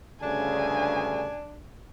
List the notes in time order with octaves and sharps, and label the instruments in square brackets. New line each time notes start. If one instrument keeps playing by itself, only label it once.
[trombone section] D2 G2 C#3 [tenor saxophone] D4 [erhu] G#5